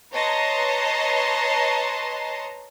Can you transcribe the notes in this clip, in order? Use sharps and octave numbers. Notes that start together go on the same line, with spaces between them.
B4 C#5 D#5 A5 A#5 C6